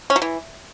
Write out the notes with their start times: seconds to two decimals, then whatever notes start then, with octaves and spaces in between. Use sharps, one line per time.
0.10 C#4
0.16 F#3
0.22 E3